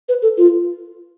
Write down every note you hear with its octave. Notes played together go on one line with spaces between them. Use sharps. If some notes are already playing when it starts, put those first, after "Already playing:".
B4
A4
F4